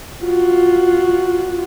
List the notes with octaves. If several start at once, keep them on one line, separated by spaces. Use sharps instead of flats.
F4 F#4